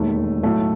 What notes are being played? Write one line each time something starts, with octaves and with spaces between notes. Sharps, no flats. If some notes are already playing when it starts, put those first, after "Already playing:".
Already playing: E1 D#2 D#3 A3
B1 A2 F#3 A3